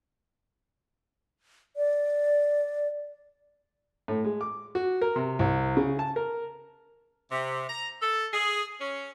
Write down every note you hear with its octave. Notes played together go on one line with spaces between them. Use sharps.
D5
A2
G#3
D6
F#4
A#4
C3
C2
C#3
A5
A#4
C3
A#5
A4
G#4
C#4